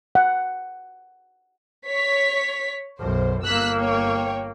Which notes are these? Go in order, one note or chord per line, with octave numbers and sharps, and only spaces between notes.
F#5
C#5 B6
B1 F#2 C5
G1 A#3 E6 F#6 B6
C#5 G5